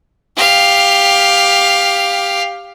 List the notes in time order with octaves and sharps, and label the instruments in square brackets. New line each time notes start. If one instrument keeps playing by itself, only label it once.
[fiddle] G4 F5